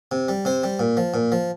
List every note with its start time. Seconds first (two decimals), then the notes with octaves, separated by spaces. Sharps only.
0.12 C3
0.29 G3
0.45 C3 C5
0.64 G3
0.79 A#2
0.97 F3
1.14 A#2
1.32 F3